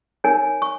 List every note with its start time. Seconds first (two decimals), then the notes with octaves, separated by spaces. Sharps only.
0.24 D#4 A#4 C#5 G#5
0.62 C#6